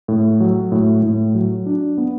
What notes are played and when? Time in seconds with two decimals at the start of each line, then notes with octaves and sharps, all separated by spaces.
0.08 A2
0.40 F#3
0.72 A2
1.03 A2
1.35 F#3
1.66 D4
1.98 B3